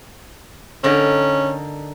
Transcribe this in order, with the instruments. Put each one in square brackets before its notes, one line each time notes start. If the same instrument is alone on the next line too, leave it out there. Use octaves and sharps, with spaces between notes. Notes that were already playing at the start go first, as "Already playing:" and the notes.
[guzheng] D3 D#4 A#4 [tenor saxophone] C#4